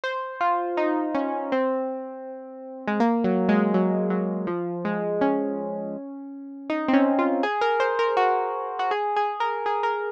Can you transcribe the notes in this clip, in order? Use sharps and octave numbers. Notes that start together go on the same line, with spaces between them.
C5
F4
D#4
C#4
C4
G#3
A#3
F#3
G#3
F#3
F#3
F3
G#3
C#4
D#4
C4
C#4
F4
G#4
A#4
C5
A#4
F#4
F#4
G#4
G#4
A#4
G#4
A#4